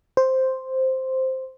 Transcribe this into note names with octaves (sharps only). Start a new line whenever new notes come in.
C5